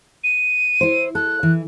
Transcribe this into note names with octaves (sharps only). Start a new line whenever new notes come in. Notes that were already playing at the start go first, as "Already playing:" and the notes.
D#7
E4 C5
A4 F#6
E3